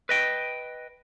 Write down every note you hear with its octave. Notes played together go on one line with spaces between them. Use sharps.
B4 D#5 G5